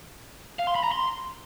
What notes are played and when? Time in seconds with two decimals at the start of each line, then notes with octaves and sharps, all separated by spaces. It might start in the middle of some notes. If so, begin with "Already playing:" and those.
0.59 F5
0.67 C6
0.75 B5
0.83 A#5
0.92 C6